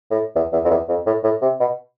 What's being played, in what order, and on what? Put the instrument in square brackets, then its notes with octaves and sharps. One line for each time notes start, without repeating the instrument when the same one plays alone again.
[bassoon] A2
E2
E2
F2
E2
F2
A2
A2
C3
B2